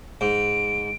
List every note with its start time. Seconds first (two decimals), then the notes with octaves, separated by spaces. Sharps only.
0.21 G#2 D7